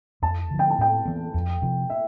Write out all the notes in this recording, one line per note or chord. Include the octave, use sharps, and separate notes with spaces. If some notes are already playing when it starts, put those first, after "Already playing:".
F2 A5
D3 F3
G5
A5
A2 G5
E3 B3
F2
C3 F3
E5